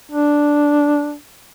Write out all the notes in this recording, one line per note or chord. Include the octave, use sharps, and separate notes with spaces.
D4